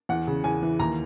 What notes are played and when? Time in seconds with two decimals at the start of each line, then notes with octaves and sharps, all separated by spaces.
0.09 E2 F#5
0.27 C#3
0.44 E2 G#5
0.63 E3
0.79 D#2 A#5